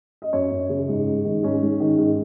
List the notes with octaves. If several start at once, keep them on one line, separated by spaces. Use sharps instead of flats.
D#5
F#2 C#5
F#2
C#3
G#2
G#2
D#3
G#2 C#4
G#2
D#3
G#2